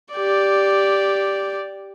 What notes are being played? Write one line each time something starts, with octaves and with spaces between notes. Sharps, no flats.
G4 D5